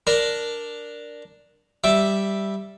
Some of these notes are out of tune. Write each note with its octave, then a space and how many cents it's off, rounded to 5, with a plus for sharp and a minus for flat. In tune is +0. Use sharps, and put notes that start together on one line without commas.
D4 +0 A#4 +0
G3 +0 E5 +0 D6 +0